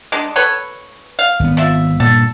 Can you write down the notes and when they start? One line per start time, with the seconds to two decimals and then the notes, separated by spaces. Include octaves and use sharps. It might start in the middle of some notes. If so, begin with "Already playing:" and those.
0.12 G#3 D4
0.36 A4 B4 C#5
1.19 F5
1.40 G#1 B3
1.57 F3 E5
2.00 G2 A#2 A4